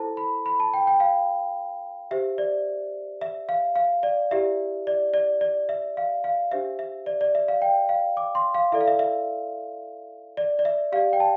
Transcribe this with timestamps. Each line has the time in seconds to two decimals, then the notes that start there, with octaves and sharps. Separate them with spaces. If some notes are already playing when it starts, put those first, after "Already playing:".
Already playing: E4 A4 C5 A5
0.17 B5
0.46 B5
0.60 A5
0.74 G5
0.87 G5
1.00 F5
2.11 G4 C5 E5
2.38 D5
3.21 E5
3.49 F5
3.76 F5
4.03 D5
4.31 E4 G4 D5 E5
4.87 D5
5.14 D5
5.41 D5
5.69 E5
5.97 F5
6.24 F5
6.52 D4 G4 C5 E5
6.79 E5
7.06 D5
7.21 D5
7.35 E5
7.48 F5
7.62 G5
7.89 F5
8.17 D6
8.35 C6
8.54 F5
8.72 E4 A4 D5 E5
8.81 F5
8.88 E5
8.99 E5
10.37 D5
10.59 D5
10.65 E5
10.92 G4 D5 F5
11.13 G5
11.20 A5